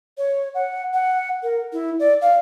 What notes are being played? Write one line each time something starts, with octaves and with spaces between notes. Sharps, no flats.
C#5
F#5
F#5
A#4
E4
D5
F5